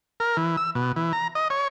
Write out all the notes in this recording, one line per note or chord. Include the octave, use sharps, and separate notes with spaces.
A#4
E3
E6
B2
E3
A#5
D#5
C#5